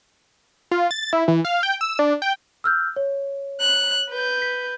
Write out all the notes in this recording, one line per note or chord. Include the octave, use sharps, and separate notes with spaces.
F4
A6
E4
E3
F5
G5
E6
D4
G5
E6 F6 G6
C#5
F#6
B4 G6
B6